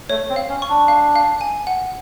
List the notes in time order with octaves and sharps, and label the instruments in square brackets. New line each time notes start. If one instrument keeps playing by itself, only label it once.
[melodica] A3 [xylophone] C#5
[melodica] C4
[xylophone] F5
[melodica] C#4
[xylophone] C#6
[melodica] D4
[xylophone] F5
F5
G#5
F#5